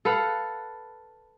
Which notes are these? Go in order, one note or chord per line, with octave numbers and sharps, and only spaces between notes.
A4 B4 F5 F#5